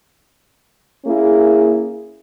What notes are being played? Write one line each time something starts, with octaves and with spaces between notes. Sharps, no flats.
A#3 C#4 E4 G#4